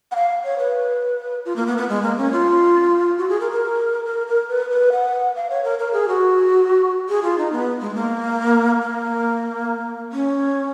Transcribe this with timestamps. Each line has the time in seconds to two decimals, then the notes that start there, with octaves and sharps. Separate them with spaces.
0.11 F#5
0.15 F5
0.44 C#5
0.58 B4
1.45 F4
1.56 A#3
1.67 B3
1.78 B3
1.89 G#3
2.03 A#3
2.17 C#4
2.32 F4
3.18 F#4
3.29 G#4
3.40 A#4
3.51 A#4
4.05 A#4
4.27 A#4
4.49 B4
4.70 B4
4.92 F#5
5.36 F5
5.50 C#5
5.64 A#4
5.79 A#4
5.93 G#4
6.08 F#4
7.09 G#4
7.23 F4
7.38 D#4
7.52 B3
7.81 G#3
7.95 A#3
8.81 A#3
10.12 C#4